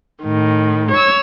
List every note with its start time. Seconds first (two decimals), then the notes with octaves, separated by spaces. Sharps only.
0.23 A2 D#3
0.91 C#5 E6